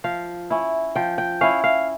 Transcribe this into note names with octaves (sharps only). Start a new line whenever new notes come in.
F3 F5
C#4 E4
F3 G5
G5
C#4 E4 F5
F5